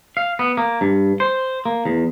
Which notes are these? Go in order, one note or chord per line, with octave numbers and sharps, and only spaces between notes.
F5
B3
A#3
G2
C5
A#3
E2